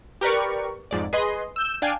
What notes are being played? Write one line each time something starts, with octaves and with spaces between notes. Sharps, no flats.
G4 A#4 B4 D5 C#6
F2 G#2 D5
G#4 B4 D#5 C6
E6 G6 E7
D4 F5 G5 G#5